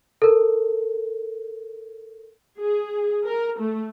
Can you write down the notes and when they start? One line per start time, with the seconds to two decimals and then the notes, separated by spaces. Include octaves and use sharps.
0.22 A4 A#4
2.59 G#4
3.26 A#4
3.59 A3